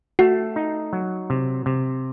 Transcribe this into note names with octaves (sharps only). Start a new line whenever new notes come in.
A3 F#4
D#4
F#3
C3
C3